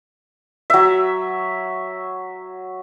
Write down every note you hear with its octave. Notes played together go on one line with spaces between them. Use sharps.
F#3 E5